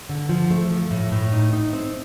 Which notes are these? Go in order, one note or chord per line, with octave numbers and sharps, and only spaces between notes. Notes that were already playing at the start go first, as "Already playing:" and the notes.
D3
F3
A3
F3
A2
A2
D#4
D#4
C4